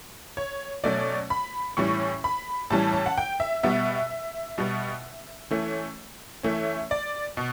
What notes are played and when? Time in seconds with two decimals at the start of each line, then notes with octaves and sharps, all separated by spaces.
0.37 C#5
0.84 B2 F#3 A3 C#4 D5
1.30 B5
1.77 A2 E3 G3 C#4 C#6
2.24 B5
2.70 A2 E3 G3 C#4 A5
2.93 A5
3.06 F#5
3.18 G5
3.40 E5
3.63 B2 G3 B3 E5
4.58 B2 G3 B3
5.51 E3 A3 C#4
6.43 E3 A3 C#4 E5
6.91 D5
7.37 B2